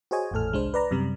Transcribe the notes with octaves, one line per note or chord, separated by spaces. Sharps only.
F#4 G#4 C5 C#5 D#5 G#5
G#1 E2 A2 A4 F6
C2 G#3 D4 C5
B4 D5 A#5
F#2 C3 G3